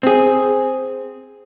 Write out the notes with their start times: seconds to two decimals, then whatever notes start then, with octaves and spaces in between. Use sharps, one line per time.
0.03 C4 G#4